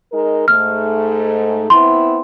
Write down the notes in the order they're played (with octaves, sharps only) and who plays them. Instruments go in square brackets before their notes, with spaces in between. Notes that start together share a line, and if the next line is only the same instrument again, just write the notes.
[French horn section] G#3 D#4 A#4
[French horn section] G#2 A3 [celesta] F6
[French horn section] B3 C4 E4 [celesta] C6